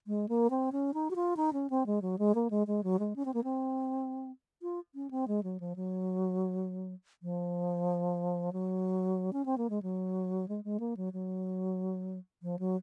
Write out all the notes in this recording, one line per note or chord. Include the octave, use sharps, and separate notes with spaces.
G#3
A#3
C4
C#4
D#4
F#4
F4
D#4
C#4
C4
G#3
F#3
G#3
A#3
G#3
G#3
F#3
G#3
C#4
C4
A#3
C4
F4
C#4
C4
G#3
F#3
F3
F#3
F3
F#3
C#4
C4
A#3
G#3
F#3
G#3
G#3
A#3
F#3
F#3
F3
F#3